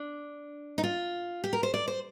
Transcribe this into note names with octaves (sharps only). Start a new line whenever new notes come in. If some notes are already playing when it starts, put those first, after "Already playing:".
Already playing: D4
D#4
F4
G4
A#4
C5
D5
C5